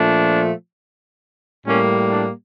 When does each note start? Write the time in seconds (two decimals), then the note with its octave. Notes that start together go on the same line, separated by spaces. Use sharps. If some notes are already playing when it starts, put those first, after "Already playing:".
Already playing: A#2 F3 A3 D4
1.66 A2 G3 A#3 C#4
2.11 D4